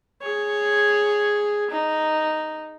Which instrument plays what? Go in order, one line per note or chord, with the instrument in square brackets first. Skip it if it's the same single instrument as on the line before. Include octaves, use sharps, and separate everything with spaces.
[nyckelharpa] G#4 C#5
D#4